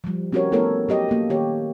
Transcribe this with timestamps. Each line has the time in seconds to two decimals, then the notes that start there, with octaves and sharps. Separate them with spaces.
0.04 F3 G3
0.32 C4 C#4 F#4 G4 A#4 C#5
0.52 A3 B3 E4 A4 A#4 C#5
0.89 F#3 G4 D#5
1.09 A#3 A4
1.30 D#3 G4 C#5